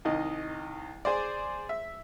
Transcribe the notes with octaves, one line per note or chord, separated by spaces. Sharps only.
C2 D#3 D#5
G#4 C5 D5
E5